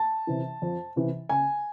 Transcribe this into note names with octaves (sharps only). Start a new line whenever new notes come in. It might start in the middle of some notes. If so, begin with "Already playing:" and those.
Already playing: A5
C3 E3
F2
C3 E3
C#3 G#5